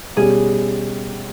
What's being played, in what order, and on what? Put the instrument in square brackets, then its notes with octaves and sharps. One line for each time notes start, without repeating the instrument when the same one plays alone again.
[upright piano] B2 G3 C#4 G4 [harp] G#4